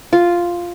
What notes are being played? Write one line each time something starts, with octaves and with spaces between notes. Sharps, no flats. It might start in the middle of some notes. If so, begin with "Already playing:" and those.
F4